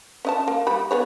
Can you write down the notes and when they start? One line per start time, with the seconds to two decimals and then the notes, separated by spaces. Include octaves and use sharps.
0.25 C#4 D#5 A5
0.48 A#3
0.67 G3 B5
0.91 B3 G#4 C#5